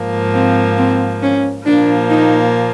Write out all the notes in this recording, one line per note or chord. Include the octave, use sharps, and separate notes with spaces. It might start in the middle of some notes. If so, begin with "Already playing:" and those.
Already playing: G#2 F3 A#3
C4
C4
C#4
A#2 F3 A#3 D4
D#4